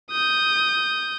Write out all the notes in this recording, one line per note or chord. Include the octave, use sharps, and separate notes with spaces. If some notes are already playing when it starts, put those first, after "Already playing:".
D#6 G6